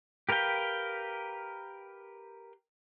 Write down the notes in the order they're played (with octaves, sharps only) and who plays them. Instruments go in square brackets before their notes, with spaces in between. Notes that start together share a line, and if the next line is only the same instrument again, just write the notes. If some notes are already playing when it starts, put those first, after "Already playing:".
[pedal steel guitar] G4 A#4 B4 F5 G5